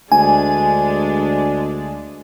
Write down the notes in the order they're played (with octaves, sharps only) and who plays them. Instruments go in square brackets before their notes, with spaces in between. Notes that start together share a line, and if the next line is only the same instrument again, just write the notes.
[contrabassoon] D2 [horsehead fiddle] G#3 D4 [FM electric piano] G#5